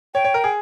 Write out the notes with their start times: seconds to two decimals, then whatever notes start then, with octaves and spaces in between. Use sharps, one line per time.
0.14 C#5 G5
0.24 C#5
0.34 A#4
0.44 G#4